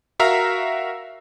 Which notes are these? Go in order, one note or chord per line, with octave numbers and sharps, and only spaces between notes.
F#4 A#4 E5 F5 A#5